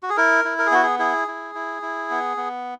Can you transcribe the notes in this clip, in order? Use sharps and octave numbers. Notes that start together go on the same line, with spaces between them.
F#4
G#4
E4 A#4
E4
A#4
G#4
B3 F#4
G#4
E4 G#4
E4
E4
E4
B3
B3